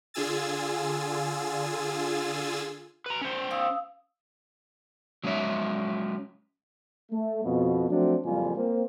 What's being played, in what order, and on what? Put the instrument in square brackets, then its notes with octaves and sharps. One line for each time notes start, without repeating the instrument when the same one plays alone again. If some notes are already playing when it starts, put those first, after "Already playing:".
[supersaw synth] D3 F4 G#4 G#5 E6 A6
[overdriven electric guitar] B4 A#5
C#4 C5
[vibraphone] F5 D#6 E6
[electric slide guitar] F#3 G#3 C#4 A#4 C#5 E5
[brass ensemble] A3
F2 B2
F3 F#3 A3 C4 D4 F#4
F#1 F2 A#2 G3 F4 G#5
A#3 C4